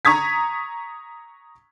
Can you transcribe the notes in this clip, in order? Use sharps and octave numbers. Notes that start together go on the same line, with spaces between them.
A#5 C#6 D#6 G#6 B6